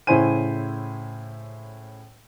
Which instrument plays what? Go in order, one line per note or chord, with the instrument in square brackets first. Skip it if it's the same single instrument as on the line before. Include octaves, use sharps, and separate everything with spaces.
[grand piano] A2 C#3 E4 C5 G#5 D#7